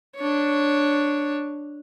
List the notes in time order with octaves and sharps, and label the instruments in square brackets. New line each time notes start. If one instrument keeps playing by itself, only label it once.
[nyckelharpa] D4 C#5